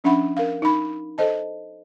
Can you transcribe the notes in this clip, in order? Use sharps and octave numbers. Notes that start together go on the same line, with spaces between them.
F3 C#4 D4 E5 F#5 B5
A#4 F5
D#4 B5
A4 C5 D#5 A5